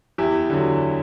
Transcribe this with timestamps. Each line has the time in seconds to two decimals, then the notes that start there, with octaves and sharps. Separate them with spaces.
0.18 E2 E4 G4
0.50 D3 F#3